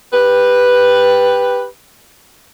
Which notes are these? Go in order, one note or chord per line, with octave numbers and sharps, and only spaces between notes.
G4 B4